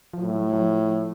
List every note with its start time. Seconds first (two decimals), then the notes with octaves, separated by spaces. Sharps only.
0.13 F3
0.21 A2 F#3
0.52 F#3
0.61 F3